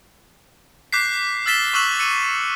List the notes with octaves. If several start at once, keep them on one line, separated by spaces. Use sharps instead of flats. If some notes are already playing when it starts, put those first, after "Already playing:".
D6 F#6 G6 B6 C7
E6 F6 A6 B6 E7 G7
C#6 D6 E6 F#6 E7 F#7
E6 C#7 D#7 F#7